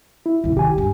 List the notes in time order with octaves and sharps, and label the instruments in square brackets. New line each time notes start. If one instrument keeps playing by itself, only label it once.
[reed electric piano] E4
[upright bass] C2 F#2
[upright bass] D#3 [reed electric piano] G4 G#5
[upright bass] G2